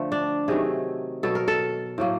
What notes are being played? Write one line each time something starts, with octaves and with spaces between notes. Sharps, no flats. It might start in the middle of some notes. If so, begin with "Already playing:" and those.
Already playing: D3 F3 A3
D4
C3 D#3 F#3 A3 G#4
B2 F#3 B3 A4
A#4
A4
A2 F#3 A#3